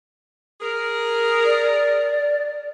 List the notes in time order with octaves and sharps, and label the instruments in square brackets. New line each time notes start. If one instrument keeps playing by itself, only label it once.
[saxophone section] G#4 A#4
[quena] D5